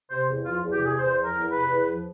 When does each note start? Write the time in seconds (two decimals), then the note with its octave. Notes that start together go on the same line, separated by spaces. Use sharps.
0.10 C3 C5
0.28 E2
0.45 F3 F4
0.63 E2
0.72 G4
0.80 C3
0.85 G#4
0.98 E2 C5
1.15 F3
1.24 A#4
1.33 E2
1.50 C3 B4
1.68 E2
1.86 F3